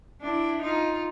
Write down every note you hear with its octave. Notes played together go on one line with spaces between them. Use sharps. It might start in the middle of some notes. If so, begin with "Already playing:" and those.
D4 E4
D#4 F4